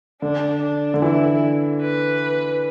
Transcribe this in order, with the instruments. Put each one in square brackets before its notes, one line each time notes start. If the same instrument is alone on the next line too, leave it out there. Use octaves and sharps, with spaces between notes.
[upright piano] D3 [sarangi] D4
[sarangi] D4
[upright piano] D3
[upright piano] E3 [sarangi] E4
[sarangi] B4